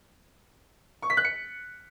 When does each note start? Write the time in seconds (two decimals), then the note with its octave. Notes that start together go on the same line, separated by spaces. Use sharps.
1.02 C#6
1.10 B6
1.17 F#6
1.25 C#7